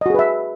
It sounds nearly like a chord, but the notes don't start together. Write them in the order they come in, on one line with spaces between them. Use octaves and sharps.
D#5 F#4 G#4 B4 E5